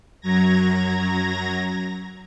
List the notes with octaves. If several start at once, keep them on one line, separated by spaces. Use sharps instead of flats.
F#2 F#3 A#5 G#6 A#6